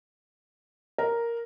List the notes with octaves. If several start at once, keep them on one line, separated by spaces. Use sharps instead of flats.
A#4